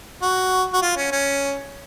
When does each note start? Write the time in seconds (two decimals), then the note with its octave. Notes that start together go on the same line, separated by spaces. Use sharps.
0.22 F#4
0.73 F#4
0.82 F4
0.97 C#4
1.12 C#4